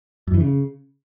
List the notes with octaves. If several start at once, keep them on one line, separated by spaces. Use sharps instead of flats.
F#2
E3
C#3